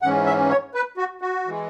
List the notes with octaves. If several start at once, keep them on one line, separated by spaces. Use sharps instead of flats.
G#2 E3 C#4 F#5
E5
C#5
B4
F#4
F#4
E3 G#3